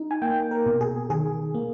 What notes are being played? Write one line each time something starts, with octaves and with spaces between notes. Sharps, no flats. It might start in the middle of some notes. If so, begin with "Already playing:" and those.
Already playing: D#4
G#5
A#3 G5
A#4
B2
G#4
D#3 G#4
A#3